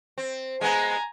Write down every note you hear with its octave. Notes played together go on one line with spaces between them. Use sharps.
C4
G#3 B3 G#5 A#5